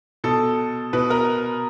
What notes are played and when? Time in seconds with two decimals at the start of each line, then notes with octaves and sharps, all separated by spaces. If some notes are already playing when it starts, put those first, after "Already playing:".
0.24 B2 A4
0.93 B2 B4
1.10 A#4